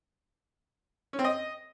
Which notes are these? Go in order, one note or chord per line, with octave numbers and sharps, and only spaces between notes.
C#4
C4
D#5